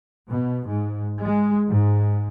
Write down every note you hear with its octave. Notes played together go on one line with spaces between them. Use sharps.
B2
G#2
G#3
G#2